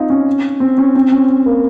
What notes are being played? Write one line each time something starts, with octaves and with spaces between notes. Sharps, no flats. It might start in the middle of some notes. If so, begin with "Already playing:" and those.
Already playing: C4 D#4 F4
C#4
C4
C#4
C4
C#4
A#3